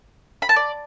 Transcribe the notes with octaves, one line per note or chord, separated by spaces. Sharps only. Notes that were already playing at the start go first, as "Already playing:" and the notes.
B5
A5
D5